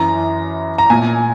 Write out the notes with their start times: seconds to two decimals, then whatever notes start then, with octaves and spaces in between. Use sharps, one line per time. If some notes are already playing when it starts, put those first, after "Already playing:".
Already playing: F#2 E3 A#5
0.78 A#5
0.90 A#2 G#5